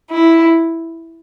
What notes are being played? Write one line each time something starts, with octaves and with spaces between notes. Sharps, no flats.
E4